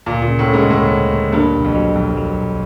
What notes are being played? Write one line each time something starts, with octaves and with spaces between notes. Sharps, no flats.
D2 A#2
A#2
C#3
A2
C#3
G#2
D2 A2
D2
D2
G2 A#3
B1
F2
F#3
B1 F2
F#3
B1